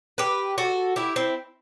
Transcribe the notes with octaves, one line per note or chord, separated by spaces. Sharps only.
G4 B4
F#4 A4
E4 G4
C4 E4